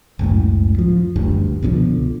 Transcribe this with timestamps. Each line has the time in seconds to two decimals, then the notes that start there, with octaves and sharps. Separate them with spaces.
0.19 F#1 C#2 F#2 A2
0.79 F3
1.16 F#1 D2 G2
1.62 C2 B2 D3 F3